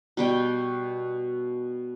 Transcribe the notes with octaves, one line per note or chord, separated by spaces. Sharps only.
B2 G3 G5